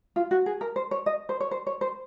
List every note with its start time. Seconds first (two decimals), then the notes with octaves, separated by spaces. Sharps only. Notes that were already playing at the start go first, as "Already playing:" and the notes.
0.16 F4
0.31 F#4
0.46 G#4
0.61 A#4
0.76 C5
0.91 C#5
1.06 D#5
1.29 C5
1.40 C#5
1.51 C5
1.67 C#5
1.81 C5